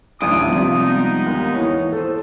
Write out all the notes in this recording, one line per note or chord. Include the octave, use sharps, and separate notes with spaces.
A1 D2 D#6 D7
C3 F3 G3
G#3 B3 D#4
D#2
E3 C#5
A4 C5